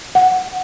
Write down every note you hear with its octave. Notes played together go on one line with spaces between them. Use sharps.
F#5